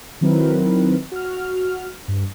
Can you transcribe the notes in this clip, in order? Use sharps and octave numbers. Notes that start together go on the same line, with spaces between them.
D#3 F#3 C4 E4 A#4 B4
F#4 F6
G2